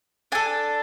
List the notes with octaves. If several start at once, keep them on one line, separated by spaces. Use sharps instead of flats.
D4 A4 G#5